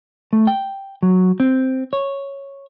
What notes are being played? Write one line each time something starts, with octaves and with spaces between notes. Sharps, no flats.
A3
G5
F#3
C4
C#5